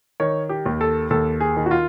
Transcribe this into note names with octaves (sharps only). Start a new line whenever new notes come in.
D#3 C#5
G4
D#2
A4
D#2 A4
G#4
D#3
F#4
F4